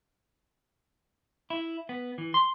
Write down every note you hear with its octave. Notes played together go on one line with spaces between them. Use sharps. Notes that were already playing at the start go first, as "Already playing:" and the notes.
E4
B3
E3
C6